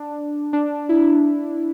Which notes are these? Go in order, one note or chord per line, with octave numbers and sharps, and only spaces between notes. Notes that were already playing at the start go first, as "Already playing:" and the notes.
Already playing: D4
D4
E4